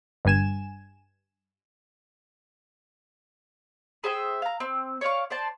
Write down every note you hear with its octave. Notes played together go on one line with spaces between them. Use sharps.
G1 G2 G#5 E7
G#4 C5 E5 G5
F5 A#5
C4
C#5 D5 F5 C#6
C5 D5 A5